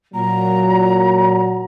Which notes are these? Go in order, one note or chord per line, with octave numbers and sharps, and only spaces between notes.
A#2 F#3 A#5